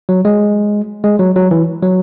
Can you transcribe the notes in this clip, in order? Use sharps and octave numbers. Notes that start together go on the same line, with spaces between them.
F#3
G#3
G#3
F#3
F#3
E3
F#3